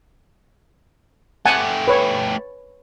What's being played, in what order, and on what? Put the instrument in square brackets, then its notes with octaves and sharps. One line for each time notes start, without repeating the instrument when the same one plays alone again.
[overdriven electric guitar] A3 G4 [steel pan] F#5 G#5 A5
[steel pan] B4 C#5